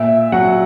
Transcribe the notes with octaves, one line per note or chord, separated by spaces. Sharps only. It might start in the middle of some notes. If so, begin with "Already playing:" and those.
Already playing: A#2 E5
F#3 F#5